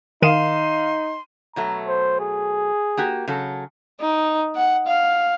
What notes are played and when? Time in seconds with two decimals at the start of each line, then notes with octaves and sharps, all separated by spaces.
0.22 D#3 D#4 F5 C6 D#7 E7
1.56 B2 F#3 A3 A#5
1.88 C5
2.20 G#4
2.97 A#3 F#4 G4
3.28 C#3 F#3 A4
4.01 D#4
4.55 F#5
4.87 F5